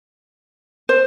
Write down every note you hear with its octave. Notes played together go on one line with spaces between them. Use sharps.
C5